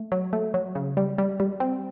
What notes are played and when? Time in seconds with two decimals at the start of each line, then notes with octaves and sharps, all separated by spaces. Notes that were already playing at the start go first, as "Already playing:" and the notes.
Already playing: A3
0.12 F#3
0.33 A3
0.54 F#3
0.75 C#3
0.97 G3
1.18 G3
1.40 G3
1.60 C4